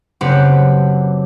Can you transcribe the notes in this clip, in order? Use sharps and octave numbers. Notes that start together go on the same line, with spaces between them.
F#1 C4 G4 B4 F#5 D6